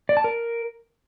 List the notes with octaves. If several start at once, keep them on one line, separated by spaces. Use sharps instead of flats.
D5
A5
A#4